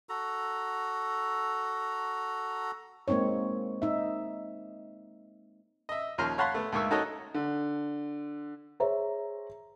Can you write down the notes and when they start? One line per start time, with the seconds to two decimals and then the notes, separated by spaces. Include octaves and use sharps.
0.09 F#4 A4 A#5
3.08 G#3 A#3 C4 D#4 C#5
3.82 D#4 E5
5.89 D#5 E5
6.18 D#2 F3 C#4 A#5 C6 F6
6.38 C#5 F5 F#5 A5 B5 C6
6.55 A3 B3
6.72 D2 G#2 A#3 E5 C#6 E6
6.91 D#4 F#4 A4 A#4 C#5 D#5
7.34 D3
8.80 G#4 C5 C#5 E5 A#5